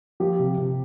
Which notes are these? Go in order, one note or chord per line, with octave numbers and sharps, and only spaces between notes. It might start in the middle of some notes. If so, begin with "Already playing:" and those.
F3 G4
C3
C3